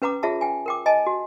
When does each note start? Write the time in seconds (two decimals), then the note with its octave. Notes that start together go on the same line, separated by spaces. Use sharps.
0.02 C#4 B4 F#5 A#5 D6
0.23 F4 G#4 C#5 E5 F#5 A5
0.41 G5 G#5
0.66 A#4 G5 D6
0.86 D#5 G#5 A5
1.07 F#4